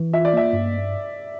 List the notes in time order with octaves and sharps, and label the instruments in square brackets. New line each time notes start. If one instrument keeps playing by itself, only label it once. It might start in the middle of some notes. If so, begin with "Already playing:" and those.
Already playing: [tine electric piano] E3
[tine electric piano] F4 [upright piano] E5
[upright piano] D5
[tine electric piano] A#3 [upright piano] E5
[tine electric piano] G2